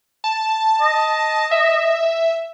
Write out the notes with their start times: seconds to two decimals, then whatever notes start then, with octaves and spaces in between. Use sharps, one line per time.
0.24 A5
0.81 D#5
1.51 E5